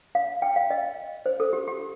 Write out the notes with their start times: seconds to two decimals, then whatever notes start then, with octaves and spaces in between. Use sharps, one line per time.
0.15 F5
0.42 G5
0.56 F5
0.71 D#5
1.26 C5
1.40 A4
1.53 G4
1.68 G4